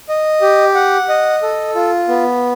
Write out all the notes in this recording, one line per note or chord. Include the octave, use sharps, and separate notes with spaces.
D#5
G4
F#5
D#5
A4
F4
B3